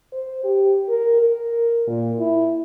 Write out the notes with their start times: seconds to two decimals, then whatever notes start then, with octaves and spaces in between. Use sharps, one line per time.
0.12 C5
0.44 G4
0.89 A#4
1.23 A#4
1.87 A#2
2.19 E4